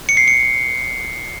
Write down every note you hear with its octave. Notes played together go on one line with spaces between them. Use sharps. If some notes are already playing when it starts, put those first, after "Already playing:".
C#7
C7
C#7